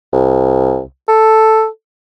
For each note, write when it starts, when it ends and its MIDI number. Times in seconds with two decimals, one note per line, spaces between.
0.13 0.82 36
1.08 1.67 69